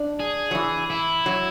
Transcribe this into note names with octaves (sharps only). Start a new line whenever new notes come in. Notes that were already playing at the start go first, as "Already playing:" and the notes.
Already playing: D4
G#4
F#3
E3
E4
F#3